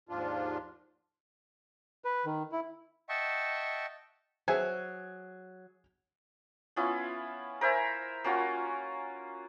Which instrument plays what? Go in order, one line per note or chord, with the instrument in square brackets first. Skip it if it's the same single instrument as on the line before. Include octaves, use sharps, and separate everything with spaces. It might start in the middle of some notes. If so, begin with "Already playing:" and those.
[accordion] D#2 G#2 F3 D4 F4
[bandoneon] B4
D#3
E4
[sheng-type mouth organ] D#5 E5 F#5 G5 A5 C#6
[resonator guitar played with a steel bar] F#3 [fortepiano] G#4 E5 G#5 [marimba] C5
[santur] B3 C#4 E4 F4
A#4 C5 E5 G#5
A#3 C#4 F4 F#4